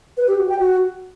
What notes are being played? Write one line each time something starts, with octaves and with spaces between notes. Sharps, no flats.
B4
G4
F#4
G5
F#4